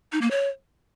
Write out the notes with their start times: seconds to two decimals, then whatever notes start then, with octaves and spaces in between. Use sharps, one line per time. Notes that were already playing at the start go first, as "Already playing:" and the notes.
0.12 D#4
0.22 A#3
0.31 C#5